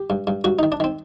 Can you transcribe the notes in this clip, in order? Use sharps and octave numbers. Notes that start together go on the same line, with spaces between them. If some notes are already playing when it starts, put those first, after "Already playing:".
Already playing: G4
G2
G2
G2 F#4
D#3 D#4
D4
D#3 C4